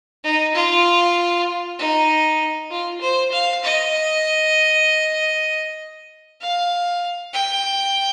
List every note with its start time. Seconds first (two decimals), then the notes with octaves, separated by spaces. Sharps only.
0.24 D#4
0.54 F4
1.79 D#4
2.71 F4
3.01 C5
3.32 F5
3.64 D#5
6.41 F5
7.34 G5